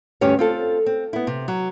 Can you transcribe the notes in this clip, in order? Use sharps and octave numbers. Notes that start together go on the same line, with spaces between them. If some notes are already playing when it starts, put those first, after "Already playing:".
D2 G2 C#4 G4 C#5
C4 F4 A4
C4
B3 E4
C3
F#3